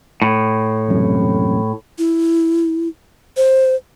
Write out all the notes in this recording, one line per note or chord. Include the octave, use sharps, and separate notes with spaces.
A2
E1 F#2 C3
E4
C5